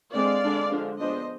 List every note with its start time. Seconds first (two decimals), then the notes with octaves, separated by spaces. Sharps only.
0.14 D3 G#3 C4 D5 F5
0.44 D3 G#3 D4
0.72 D3 F3 G#3 D4
1.00 F3 G#3 B3 D4 C5 D#5